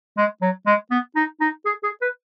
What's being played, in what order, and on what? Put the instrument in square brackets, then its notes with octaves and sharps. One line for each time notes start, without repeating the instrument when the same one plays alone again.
[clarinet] G#3
F#3
G#3
B3
D#4
D#4
G#4
G#4
B4